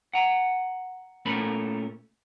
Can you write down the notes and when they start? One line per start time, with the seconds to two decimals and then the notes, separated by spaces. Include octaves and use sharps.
0.13 F#5 A#5
1.25 A#2 A3 C#4 A4 A#4 B5